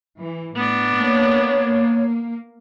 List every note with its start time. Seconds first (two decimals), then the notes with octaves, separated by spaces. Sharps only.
0.18 E3
0.56 A2 B3 D4
0.97 A#3 C#5